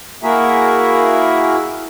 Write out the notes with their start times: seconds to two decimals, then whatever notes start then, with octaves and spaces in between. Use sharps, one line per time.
0.23 A#3 E4 F#4 G#4 A#4 E5